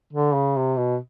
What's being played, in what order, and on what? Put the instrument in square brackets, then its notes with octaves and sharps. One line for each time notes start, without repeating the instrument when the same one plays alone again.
[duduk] D3
C#3
C3
B2